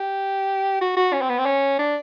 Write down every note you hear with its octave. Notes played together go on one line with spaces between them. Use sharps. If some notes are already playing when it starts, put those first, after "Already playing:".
Already playing: G4
F#4
F#4
C#4
C4
B3
C4
C#4
D4